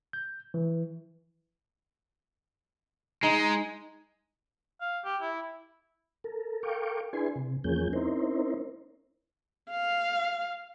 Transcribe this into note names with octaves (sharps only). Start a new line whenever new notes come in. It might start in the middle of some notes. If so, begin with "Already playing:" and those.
G6
E3
G#3 D#4
F5
G4
E4
A4 A#4
A4 A#4 F5 G5 C#6 D6
D4 E4 G#4 B4 G#5 C6
C3
E2 F3 A#3 C#4 G#4 G6
C4 C#4 D#4 E4 A#4 C5
F5